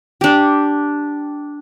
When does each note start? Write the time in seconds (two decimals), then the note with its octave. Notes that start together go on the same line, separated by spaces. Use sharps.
0.21 D4 G4